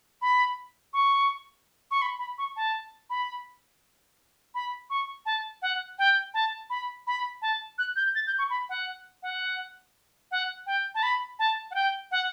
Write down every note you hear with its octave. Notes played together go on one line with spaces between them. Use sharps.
B5
C#6
C#6
B5
B5
C#6
A5
B5
B5
C#6
A5
F#5
G5
A5
B5
B5
A5
F#6
G6
A6
G6
C#6
B5
F#5
F#5
F#5
G5
A5
B5
A5
F#5
G5
F#5